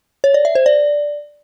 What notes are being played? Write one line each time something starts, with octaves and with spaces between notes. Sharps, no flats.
C#5
D5
E5
C5
D5